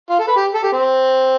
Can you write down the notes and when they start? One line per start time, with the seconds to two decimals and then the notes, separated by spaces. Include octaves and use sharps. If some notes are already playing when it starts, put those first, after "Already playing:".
0.10 F4
0.20 A4
0.28 B4
0.36 G4
0.55 A4
0.63 G4
0.73 C4